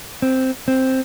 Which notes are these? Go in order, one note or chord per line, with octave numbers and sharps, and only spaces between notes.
C4
C4